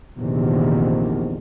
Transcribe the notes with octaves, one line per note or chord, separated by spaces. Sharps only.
A#1 E2 C3 D#3